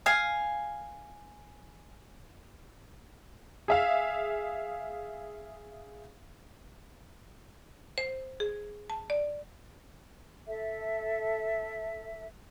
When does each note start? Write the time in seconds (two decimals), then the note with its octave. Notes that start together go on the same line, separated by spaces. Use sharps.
0.06 F5 G#5 D#6
3.68 G#4 E5 F5
7.98 C5
8.40 G#4
8.90 A5
9.10 D5
10.46 A4 E5